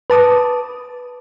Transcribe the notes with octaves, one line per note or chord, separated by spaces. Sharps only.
B4 A5 D6 D#6